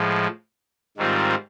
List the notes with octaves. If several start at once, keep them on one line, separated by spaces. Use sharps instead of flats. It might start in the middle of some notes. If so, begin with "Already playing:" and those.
Already playing: A2 F3 G#3
G#2 D#3 G3 C4 F4